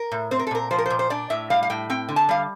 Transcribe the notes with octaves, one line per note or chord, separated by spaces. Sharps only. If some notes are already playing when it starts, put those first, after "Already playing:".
Already playing: A#4
A2
C4 C5
A#4
A4
A#2 A#4
F3 C5
A#4
C5
A#2
C5
D4 D5
A2 E5
G3 F5
F5
A2 G5
C4 G5
D3
A5
G3 F5